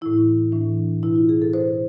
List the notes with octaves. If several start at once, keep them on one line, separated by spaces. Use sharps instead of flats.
A2 E3 E4
A2 E3 D4
B2 E4
F4
G#4
A4
B2 C5